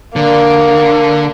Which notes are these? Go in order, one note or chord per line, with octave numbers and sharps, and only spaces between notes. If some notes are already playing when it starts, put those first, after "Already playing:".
D3 A#3